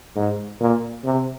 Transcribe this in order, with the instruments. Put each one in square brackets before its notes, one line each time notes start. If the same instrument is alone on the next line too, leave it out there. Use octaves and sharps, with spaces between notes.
[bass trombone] G#2
A#2
C3